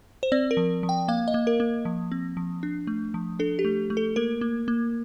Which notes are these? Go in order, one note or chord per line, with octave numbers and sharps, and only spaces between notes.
C5
C4 D5
A#4
F3
F3
G5
A#3 F5
D#5
A#3
A#4
A#3
F3
C4
F3
D4
A3
F3
D4 A4
G4
A3
A3
A4
A#3 A#4
A#3
A#3